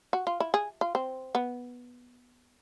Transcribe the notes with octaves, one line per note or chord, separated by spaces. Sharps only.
F#4
F4
E4
G#4
F4
C4
B3